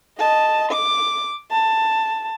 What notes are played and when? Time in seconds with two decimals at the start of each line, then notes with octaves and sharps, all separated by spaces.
0.19 D#5 A5
0.72 D6
1.52 A5